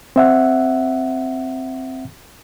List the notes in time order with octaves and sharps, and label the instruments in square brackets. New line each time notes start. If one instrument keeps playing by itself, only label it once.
[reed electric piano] C4 E5 F#5